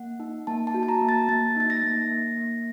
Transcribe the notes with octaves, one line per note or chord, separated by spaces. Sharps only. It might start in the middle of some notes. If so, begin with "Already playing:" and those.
Already playing: A#3 F#5
D#4
A#3 A5
A5
F#4
A5
A#5
A#3
A6
A#3 A6
D#4 A6
A#6
A#3
A#3
A#3